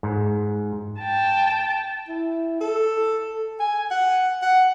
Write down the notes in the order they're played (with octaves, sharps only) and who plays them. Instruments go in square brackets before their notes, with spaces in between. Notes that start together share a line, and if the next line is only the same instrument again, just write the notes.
[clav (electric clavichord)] G#2
[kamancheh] G5 A5
[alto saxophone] E4
A4
G#5
F#5
F#5